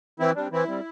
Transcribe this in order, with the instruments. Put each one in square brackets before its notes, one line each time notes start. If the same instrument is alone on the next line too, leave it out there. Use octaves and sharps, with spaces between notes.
[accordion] E3 C4 E4
G3 C4 D4
E3 C4 E4
G3 C4